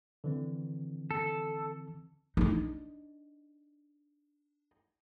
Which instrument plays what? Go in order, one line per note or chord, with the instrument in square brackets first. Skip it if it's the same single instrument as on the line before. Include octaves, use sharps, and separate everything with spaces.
[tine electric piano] D3 E3 C4
[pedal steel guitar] A4
[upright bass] D4 D#4